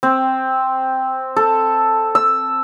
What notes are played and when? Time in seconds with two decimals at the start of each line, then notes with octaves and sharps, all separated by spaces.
0.03 C4
1.36 A4
2.15 E6